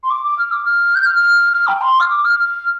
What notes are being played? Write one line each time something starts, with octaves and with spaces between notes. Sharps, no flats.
C6
D6
D6
F6
D6
F6
G6
F6
F6
F6
G5
C6
F6
D6
F6
F6